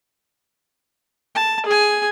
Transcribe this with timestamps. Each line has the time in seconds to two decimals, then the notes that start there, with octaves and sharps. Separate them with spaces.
1.35 A5
1.66 G#4 G#5